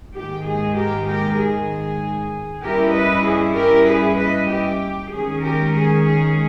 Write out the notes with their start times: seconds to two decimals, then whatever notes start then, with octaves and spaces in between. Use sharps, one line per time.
0.14 G#2 D#3 G#3 G4
0.45 G#4
0.76 G4 A#4
1.07 G4 A#4
1.38 G#4
2.62 G2 G3 C#4 E4 G4 A#4
2.93 B4 D#5
3.25 G#4
3.55 G4 A#4
3.88 G#4 B4
4.18 B4 D#5
4.49 G4
5.11 D#3 G#3 C#4 G#4
5.42 G4 A#4
5.74 G#4
6.05 G#4